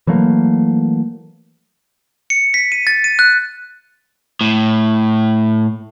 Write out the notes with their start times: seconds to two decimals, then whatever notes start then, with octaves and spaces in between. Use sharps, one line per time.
0.07 E3 F#3 A3 A#3
2.30 C#7
2.54 B6
2.72 D#7
2.87 A6
3.04 D#7
3.19 F#6
4.41 A2